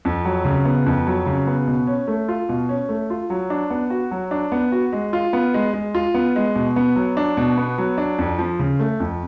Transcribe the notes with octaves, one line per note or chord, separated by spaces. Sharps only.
F2
F#3
C#3
B3
F2
F#3
C#3
B3
B2
C#4
A3
F4
B2
C#4
A3
F4
F#3
D4
B3
F#4
F#3
D4
B3
F#4
G#3
F4
B3
G#3
G#3
F4
B3
G#3
B2
B3
F#3
D4
B2
B3
F#3
D4
F2
F3
C#3
A3
F2